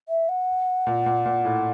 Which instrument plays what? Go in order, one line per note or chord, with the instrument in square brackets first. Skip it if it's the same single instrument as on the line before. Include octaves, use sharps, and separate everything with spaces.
[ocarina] E5
F#5
[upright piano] A#2
A#2
A#2
A2